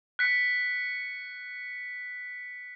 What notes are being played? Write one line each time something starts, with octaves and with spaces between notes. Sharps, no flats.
F#6 B6 C#7